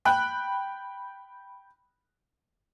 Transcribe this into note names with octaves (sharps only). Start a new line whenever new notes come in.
G5 B5 F#6